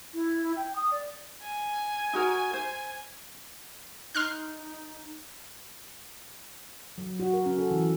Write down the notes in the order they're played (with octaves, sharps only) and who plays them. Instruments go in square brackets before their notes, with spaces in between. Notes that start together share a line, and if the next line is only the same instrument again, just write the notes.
[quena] E4
G5
D#6
D5
[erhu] G#5
[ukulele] D#4 F#4 A#4
C5
[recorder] D#4 [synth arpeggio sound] C6 F6 F#6
[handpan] F#3
F#4
A#4
C#4
A4
E3